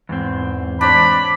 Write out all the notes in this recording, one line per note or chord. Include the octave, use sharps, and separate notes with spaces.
E2 G#2 C4
D4 C5 C#5 B5